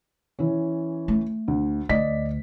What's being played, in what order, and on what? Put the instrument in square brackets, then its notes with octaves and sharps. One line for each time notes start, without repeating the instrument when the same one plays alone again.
[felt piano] E3 C#4
[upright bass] A3
[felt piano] D2
[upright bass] D2 [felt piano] D5 D#5 B6